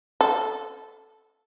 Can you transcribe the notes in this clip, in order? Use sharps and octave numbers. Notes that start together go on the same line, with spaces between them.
A4